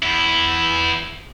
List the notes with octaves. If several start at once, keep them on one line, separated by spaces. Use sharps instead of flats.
E2 E4